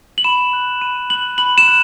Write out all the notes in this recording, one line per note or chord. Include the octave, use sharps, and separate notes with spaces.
F#7
B5 E7
F#6
B5 D#7
F#6 F#7
B5 F#7
E7
F#6